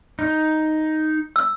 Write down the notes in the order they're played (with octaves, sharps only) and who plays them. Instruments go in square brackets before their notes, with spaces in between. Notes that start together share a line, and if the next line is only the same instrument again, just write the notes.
[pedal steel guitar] D#4
[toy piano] E6